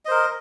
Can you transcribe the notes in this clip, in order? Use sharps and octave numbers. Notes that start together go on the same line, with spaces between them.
A#4 C5 D#5